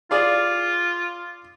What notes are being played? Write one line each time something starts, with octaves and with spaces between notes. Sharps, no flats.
F4 G#4 D5 F5